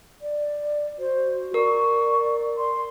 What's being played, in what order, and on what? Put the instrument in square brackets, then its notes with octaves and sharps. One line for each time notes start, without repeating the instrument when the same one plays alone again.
[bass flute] D5
[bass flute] F#4 [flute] C5
[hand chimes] A#4 [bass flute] D5 [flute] C#6
[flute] C6